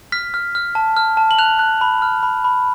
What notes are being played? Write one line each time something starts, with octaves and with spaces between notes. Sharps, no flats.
F6 B6
F6
F6
A5
F6
A5
F#7
F#6 F7
F#6
B5
F6
B5
B5